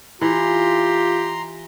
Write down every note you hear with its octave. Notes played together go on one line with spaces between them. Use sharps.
E3 F4 G4 A#5 C6